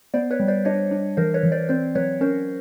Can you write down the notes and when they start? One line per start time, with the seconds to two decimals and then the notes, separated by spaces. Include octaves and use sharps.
0.14 B3 C5 D5
0.31 B4 C#5
0.40 G3
0.48 C5 D5
0.65 D4 C#5 D#5
0.91 D4
1.17 E3 A#4 C5
1.34 B4 C#5
1.43 E3
1.52 C5 D5
1.69 C4 C5 D5
1.95 F#3 B4 C#5
2.21 C#4 A#4 C5